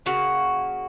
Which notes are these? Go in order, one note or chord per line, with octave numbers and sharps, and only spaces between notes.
C#3 A#3 F#4